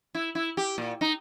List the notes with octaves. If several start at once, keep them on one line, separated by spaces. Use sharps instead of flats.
E4
E4
G4
A#2
D#4